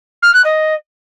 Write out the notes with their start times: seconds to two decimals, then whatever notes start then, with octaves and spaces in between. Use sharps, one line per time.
0.22 F6
0.33 F#6
0.44 D#5